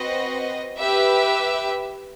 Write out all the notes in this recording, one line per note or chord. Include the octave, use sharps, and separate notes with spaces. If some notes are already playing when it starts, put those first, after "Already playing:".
Already playing: C4 F#4 B4 D#5
G4 B4 E5